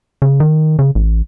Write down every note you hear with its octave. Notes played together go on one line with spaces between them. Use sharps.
C#3
D#3
C#3
A1